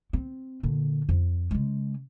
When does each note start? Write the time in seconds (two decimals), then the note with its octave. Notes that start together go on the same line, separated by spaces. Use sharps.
0.13 C4
0.63 A#2 D3
1.09 F2
1.51 C#3 G#3